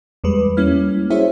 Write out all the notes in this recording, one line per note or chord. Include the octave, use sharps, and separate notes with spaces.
E2 G3 G#3 B4
G3 A#3 C#4 E4 F6
E4 F#4 G#4 C5 C#5 E5